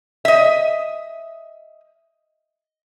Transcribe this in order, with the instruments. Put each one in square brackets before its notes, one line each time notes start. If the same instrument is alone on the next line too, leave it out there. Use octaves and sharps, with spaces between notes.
[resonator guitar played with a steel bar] D#5 E5